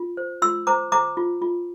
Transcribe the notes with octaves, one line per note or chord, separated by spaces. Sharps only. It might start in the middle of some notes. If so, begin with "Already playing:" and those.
Already playing: F4
C5
F4 C6 E6
C5 A#5 D6
C5 A#5 D6
F4
F4